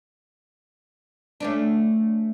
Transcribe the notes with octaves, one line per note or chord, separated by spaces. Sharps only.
A3 C#4 D4